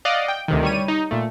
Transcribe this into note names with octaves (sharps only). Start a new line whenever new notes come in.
D5 D#5 F5 F#5
G5
D2 C3 D#3
G3 C#5 D#7
D#4
A#2 A3